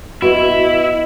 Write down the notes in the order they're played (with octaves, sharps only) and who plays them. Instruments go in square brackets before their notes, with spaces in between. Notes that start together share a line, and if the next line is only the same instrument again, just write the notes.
[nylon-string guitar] B3 F#4 [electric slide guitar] E4 [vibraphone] D#5